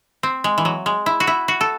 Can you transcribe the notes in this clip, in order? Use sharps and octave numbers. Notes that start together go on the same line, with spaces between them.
C4
G#3
E3
F#3
G#3
E4
F#4
E4
F#4
A4